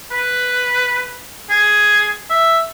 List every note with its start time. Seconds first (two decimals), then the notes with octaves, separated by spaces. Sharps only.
0.12 B4
1.50 G#4
2.30 E5